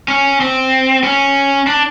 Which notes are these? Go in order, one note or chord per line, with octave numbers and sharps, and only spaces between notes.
C#4
C4
C#4
D4